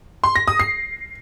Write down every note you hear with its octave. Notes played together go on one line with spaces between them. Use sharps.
C6
A#6
D#6
C7